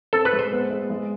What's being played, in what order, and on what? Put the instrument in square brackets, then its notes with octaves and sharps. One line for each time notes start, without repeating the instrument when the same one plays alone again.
[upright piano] C4 [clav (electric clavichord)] A4
[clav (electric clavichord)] B4
[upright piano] G#3
[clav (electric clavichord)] C5
[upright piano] B3
G#3
G#3